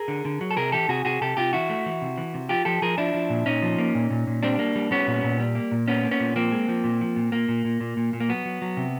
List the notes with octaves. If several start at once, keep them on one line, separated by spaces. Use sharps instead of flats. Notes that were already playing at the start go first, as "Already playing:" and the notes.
Already playing: G#4 A#4
D3
D3
F#3
A4
C3 G#4 A#4
E3 G4 A4
C3 F#4 G#4
C3 F#4 G#4
C3 G4 A4
C3 F4 G4
E3 E4 F#4
A3
E3
C3
E3
C3
F3 F4 G4
F3 G4 A4
F3 G#4 A#4
F3 D4 E4
F3
A#2
A#2 C#4 D#4
F3
A#3
A#2
A#2
A#2
G3 C4 D4
A#3
G3
G3 B3 C#4
A#2
A#2
G3
A#3
A#2
A#3 B3 C#4
A#3
B3 C#4
A#2
F3 A#3 C4
G#3
F3
A#2
F3
A#2
A#2 A#3
A#2
A#2
A#2
A#2
A#2
A#3
F#3 B3
F#3
F#3
C3